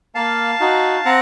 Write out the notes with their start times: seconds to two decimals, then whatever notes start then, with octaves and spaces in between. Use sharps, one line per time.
0.15 A#3 F5 A5
0.60 D#4 F#4
1.05 C4 F#5 A#5